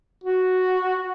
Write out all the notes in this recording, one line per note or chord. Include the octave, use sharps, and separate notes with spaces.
F#4